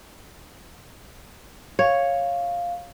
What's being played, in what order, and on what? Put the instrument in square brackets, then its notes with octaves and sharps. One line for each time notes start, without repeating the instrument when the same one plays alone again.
[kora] C#5 [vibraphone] F5